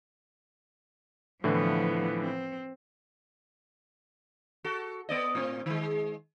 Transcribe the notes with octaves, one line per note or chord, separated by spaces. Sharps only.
A2 D3 E3 F3 B3
C4
F#4 A4
B3 D5 D#5
A2 C4
D#3 G#3